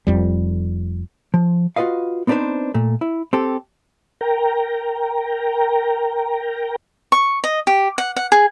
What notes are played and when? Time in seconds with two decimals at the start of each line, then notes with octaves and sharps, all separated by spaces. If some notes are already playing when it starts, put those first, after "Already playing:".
0.07 F1 C2 F2 G3
1.34 F3
1.76 F4 F#4 B4 D#5 F5
2.27 B3 C4 D4 D#4 B4 C5
2.74 A#2 A3
3.01 E4
3.33 C4 G4 A4
4.21 A#4 G5 A#5
7.12 C#6
7.44 D#5
7.67 G4
7.98 F#5
8.16 F#5
8.32 G#4